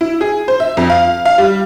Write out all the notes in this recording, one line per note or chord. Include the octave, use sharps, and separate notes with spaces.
E4
G#4
C5
E5
F2
F5
F5
G3